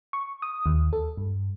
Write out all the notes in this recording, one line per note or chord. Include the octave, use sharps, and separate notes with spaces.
C#6
D#6
D#2
A4
G2